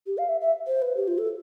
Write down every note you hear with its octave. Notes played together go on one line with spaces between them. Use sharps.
G4
F5
E5
E5
C5
B4
G4
F4
A4